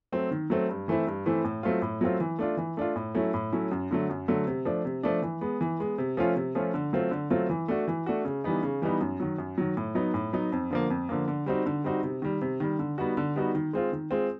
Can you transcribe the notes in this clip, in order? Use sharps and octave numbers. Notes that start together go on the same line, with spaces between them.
F#3 A3 C4
D#3
F#3 A3 C4
G2
E3 A3 C4 E4
G2
E3 A3 C4 E4
A2
F#3 A3 C4 F4
A2
F#3 A3 C4 F4
E3
A3 D4 F4
E3
A3 D4 F4
A2
F#3 A3 C#4 E4
A2
F#3 A3 C#4 E4
F#2
D3 F#3 A3
F#2
D3 F#3 A3
C3
F3 A3 D4
C3
F3 A3 D4
E3
G#3 B3
E3
G#3 B3
C3
F3 A3 C#4 F4
C3
F3 A3 C#4 F4
D3
F#3 A3 C4 F4
D3
F#3 A3 C4 F4
E3
A3 D4 F#4
E3
A3 D4 F#4
C#3
E3 G3 B3 D#4
C#3
E3 G3 B3 D#4
F#2
D#3 F#3
F#2
D#3 F#3
A2
F#3 B3 D#4
A2
F#3 B3 D#4
F2
D3 F3 A#3
F2
D3 F3 A#3
D3
G3 C4 D#4 F#4
D3
G3 C4 D#4 F#4
C3
D#3 G3
C3
D#3 G3
D3
G3 B3 D#4 F#4
D3
G3 B3 D#4 F#4
D#3
G#3 C4 F4
D#3
G#3 C4 F4